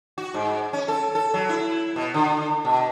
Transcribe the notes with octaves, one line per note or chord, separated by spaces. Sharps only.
F#4
G#2
C#4
A4
A4
F#3
E4
B2
D3
B2